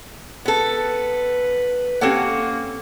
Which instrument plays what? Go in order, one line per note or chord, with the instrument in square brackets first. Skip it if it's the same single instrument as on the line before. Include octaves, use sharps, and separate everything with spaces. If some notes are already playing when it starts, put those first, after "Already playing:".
[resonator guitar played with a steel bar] B3 A4 [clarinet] B4
[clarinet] A#3 [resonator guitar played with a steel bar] C4 C#4 F#5 [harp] G4 A4